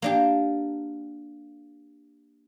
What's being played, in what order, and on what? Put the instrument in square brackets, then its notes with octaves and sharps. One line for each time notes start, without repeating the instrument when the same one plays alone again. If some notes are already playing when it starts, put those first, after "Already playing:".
[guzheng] A#3 D4 G4